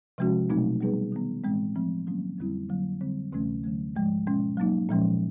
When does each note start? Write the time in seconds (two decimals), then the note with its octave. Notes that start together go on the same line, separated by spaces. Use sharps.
0.18 C3 F3 G#3 C#4 F#4
0.49 B2 F#3 A3 C4 D#4
0.81 G3 B3 D#4 G#4 B4
1.12 D#3 G3 B3
1.44 A2 E3 G#3 C4
1.75 F3 A3 C4
2.07 D#3 F#3 A#3 C#4
2.38 F2 D3 G3 C4 E4
2.69 D3 F#3 A#3
3.01 D3 G3 C4
3.32 D2 C3 E3 A3 C#4
3.64 D3 F#3 A3
3.95 G#2 F3 G#3
4.27 B2 G#3 C#4
4.57 F#3 A#3 D#4
4.89 A#2 F3 G#3 C#4